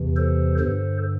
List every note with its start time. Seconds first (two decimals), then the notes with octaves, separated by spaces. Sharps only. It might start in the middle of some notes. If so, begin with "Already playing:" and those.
Already playing: E2 C3 E3
0.16 A4 C5
0.59 G2 D3 A4 C5